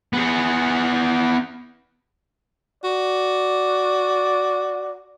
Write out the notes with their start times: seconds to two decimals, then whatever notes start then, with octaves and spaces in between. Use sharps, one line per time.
0.13 B3 G#4
2.84 F#4 D5